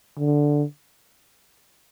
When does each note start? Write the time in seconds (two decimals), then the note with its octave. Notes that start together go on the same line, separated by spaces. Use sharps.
0.18 D3